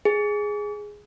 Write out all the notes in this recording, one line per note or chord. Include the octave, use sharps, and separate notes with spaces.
G#4